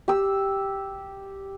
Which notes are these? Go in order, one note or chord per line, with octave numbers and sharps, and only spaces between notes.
G4 E6